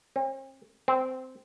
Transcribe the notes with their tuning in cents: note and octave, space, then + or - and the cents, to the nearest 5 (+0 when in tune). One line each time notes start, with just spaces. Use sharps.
C4 +45
C4 -15